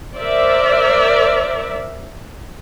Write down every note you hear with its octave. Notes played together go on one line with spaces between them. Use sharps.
A#4 C5 D5 E5